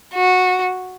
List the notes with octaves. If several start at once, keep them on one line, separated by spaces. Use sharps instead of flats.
F#4